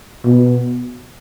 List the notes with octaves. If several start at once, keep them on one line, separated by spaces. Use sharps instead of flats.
B2